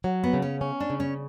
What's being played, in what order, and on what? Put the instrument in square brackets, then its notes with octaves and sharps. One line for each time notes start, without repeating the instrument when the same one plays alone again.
[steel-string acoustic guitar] F#3
[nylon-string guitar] B3
[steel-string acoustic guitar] C#3
[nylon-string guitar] C#4
[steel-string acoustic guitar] C#4
[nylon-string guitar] D4
[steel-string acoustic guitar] C#3
[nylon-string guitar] C#4